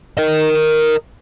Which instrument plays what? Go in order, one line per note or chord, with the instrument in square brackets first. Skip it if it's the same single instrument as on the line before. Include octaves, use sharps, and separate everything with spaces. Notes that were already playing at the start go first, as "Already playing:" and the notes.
[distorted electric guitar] A#4 D#5